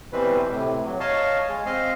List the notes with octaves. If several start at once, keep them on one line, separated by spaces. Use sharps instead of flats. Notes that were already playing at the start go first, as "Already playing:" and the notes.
B2 E3 G3 C4 B4
A2 C3
F#3
C#5 D#5 F5 A5
G#3
C4 D#5 F5